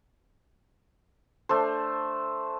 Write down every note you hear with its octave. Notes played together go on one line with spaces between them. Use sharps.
A3 D4 C5